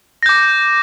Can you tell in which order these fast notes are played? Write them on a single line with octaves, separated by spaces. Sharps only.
A#6 G6 D6